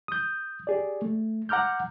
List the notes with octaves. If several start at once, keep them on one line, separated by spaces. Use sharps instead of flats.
D#6 G6
G4 G#4 D5
A3
F#5 A#5 D6 F6 G6